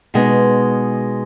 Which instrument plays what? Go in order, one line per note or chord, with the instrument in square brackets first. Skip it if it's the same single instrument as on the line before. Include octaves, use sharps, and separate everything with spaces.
[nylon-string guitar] B2 G#3 B3 D#4